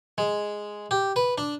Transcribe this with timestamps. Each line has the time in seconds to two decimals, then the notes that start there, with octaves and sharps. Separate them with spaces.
0.18 G#3
0.91 G4
1.16 B4
1.38 D4